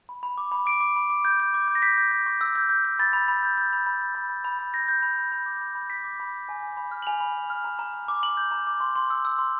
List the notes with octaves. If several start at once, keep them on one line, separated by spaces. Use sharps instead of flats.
B5
B5
D6
B5
D6 D7
D6
B5
D6
G6
G6
D6
G6
A#6
G6 B6
G6
G6
C#6
E6
G6
G6
G6
B5 A6
B5
B5
G6
G6
B5
B5
B5
B5
B5
B5
B5
G6 A#6
G6
B5
B5
B5
D6
B5
B5
B5 B6
D6
B5
B5
G#5
G#5
B5
F6
F#7
G#5 F7
B5
G#5
F6
A#5
A#5
A#5
D6
A#5 F#7
G6
A#5
D6
C6
C6
E6
E6
C6